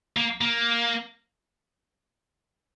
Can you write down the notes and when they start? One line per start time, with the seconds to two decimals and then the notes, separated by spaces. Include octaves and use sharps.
0.17 A#3
0.41 A#3